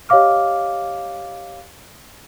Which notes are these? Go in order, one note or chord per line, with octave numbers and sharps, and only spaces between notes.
G4 C#5 D#5 F5 D6 F6